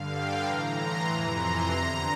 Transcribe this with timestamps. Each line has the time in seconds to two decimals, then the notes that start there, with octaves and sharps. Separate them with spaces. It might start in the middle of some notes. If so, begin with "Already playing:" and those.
Already playing: G2 D3 F5
0.13 G5
0.43 A2 E3 A#5
0.75 C6
1.06 F2 C3 E3 A#5
1.38 C6
1.69 E2 D3 A#5